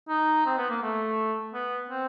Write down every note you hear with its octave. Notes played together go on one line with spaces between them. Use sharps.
D#4
C4
B3
A#3
A3
B3
C4